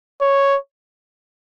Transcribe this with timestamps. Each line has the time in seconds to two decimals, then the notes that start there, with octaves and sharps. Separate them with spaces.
0.21 C#5